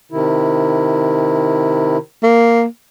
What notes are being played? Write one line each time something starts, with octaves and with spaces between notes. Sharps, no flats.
C3 D#3 E4
A#3